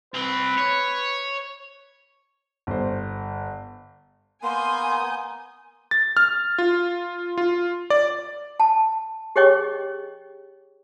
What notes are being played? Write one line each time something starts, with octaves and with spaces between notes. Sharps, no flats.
C2 C4 B4
C#5
G1 C5
A#3 B3 A#4 G#5 C6 D#6 G6
A6
F6
F4
F4
D5
A5
G4 G#4 C#5 D#5 G5 C#6